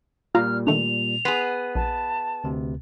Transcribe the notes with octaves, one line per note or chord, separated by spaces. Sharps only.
A#2 G3 F4 F5 A#5 F6
D#3 A3 D4 F7
B3 G#4 B5 C6
A#1 A5
D2 C3